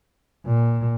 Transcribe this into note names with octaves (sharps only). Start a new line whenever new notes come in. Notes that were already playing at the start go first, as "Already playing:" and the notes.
A#2